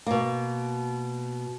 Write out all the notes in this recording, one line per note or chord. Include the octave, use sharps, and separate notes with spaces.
B2 A#3